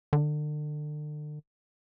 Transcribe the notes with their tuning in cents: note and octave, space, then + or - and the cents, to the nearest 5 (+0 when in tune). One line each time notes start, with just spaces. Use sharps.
D3 +35